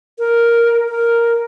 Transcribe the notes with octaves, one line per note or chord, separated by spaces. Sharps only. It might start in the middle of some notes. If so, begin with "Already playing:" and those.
A#4
A#4